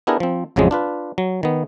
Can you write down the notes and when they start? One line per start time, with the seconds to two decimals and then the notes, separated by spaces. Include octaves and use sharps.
0.07 B3 D4 E4 G4 G#4 A#4
0.20 F3 C4
0.56 A1 F2 C#3 F3 F#3 G#3
0.71 D4 F4 B4
1.18 F#3
1.43 D#3 B3